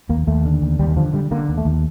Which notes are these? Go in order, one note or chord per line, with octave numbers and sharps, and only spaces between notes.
D#2 A#3
D#2 A3
D3
D#2
D#2 G3
D#3
D3 F3
D3 G3
D3 A#3
D#2
A3
D#2